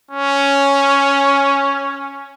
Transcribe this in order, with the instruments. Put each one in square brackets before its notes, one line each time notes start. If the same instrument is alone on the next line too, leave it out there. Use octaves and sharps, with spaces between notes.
[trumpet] C#4